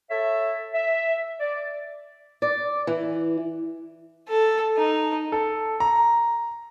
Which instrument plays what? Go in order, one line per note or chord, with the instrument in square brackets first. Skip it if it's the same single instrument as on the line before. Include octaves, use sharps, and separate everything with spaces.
[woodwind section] A4 C#5 E5
E5
D5
[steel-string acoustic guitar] D5
E3
[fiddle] A4
D#4
[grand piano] A4
A#5